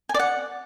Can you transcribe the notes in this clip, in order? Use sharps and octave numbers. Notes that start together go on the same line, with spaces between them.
G#5
D5
F#5